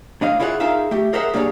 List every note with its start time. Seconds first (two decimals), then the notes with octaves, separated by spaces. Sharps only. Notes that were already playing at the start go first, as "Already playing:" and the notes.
0.21 A2 D4 D#5 F5
0.40 E4 F4 G#4 C#5 D5 F#5
0.60 D#4 F4 G#4 A#4 E5 F5
0.91 A3 G4
1.13 G#4 A#4 C5 D#5 E5 F#5
1.34 G3 A#3 D4 G#4 C#5